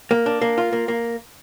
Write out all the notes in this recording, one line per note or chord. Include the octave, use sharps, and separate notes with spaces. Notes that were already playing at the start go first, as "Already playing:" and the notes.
A#3
D4
A#3
F4
A#3
A#3